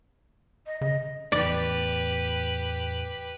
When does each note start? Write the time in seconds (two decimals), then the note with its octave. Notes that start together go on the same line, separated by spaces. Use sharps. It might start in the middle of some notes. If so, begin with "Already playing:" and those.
0.67 D#5
0.81 C#3 D#5
1.32 E2 A2 E3 G4 B4 D5